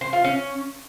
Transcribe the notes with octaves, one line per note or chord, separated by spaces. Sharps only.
C5
F4
C#4